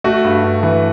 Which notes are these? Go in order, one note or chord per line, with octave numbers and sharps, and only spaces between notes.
A3 F#4
G2
G2
E3